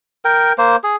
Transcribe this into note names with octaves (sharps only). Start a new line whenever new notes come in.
A#4 G5
A#3 C5
G#4